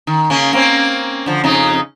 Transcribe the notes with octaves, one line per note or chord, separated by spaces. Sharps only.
D#3
C#3 A#3 C#4
A#3 C4 C#4
D3 F3
F2 C#3 D#4